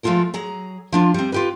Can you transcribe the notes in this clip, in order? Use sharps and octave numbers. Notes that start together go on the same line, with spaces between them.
F3 G#3 A3 F4 A4 A#4
F#3 G#4 A#5
F3 D4 F4
G3 C4
F4 G4 B4